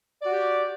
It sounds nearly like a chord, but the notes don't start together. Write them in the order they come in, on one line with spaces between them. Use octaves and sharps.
D5 F#4 G4